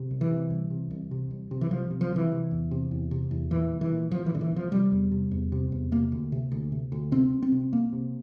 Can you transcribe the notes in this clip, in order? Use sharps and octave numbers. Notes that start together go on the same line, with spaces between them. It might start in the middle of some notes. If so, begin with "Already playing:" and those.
Already playing: C3
C2
E3
C3
C2
C3
C2
C3
C2
C3
E3
C2 F3
C3
F3
C2 E3
C3
E2
C3
E2
C3
E2
A#2 E3
C2
E3
A#2
C2 F3
E3
A#2 D3
E3
C2 F3
C3 G3
E2
C3
E2
C3
E2
C3 A#3
D2
C3
D2
C3
D2
C3 C4
C2
C4
C3
C2 A#3
C3